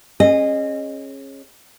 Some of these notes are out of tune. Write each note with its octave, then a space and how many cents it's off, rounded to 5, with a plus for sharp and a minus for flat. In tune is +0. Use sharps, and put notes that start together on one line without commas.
C#4 -30 G#4 +0 D#5 -20